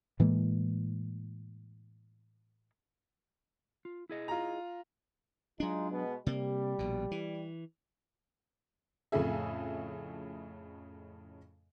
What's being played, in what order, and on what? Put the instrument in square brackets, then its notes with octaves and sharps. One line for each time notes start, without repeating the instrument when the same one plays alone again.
[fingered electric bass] A2 E3 G#3 A#3
[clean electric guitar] F4
E4 G#4 D#5
[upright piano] F4 A#5
[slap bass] F#3 D4 [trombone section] G#3 D#4 F4
[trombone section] B2 G#3 B3
[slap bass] C3 A#3 [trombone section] G3
[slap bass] A#1 B2
E3
[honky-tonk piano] F2 A2 C#3 A3 G#4 E5